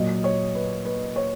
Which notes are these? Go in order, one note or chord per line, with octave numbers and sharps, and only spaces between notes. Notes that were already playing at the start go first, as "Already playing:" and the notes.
Already playing: A#2 F#3 D#5
C#5
B4
B4
C#5